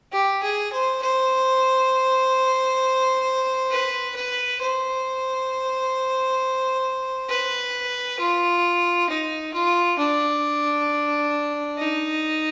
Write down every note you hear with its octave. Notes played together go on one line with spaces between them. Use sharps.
G4
G#4
C5
C5
B4
B4
C5
B4
F4
D#4
F4
D4
D#4